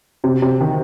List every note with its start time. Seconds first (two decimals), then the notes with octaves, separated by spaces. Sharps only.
0.24 C3
0.42 C3
0.61 D#3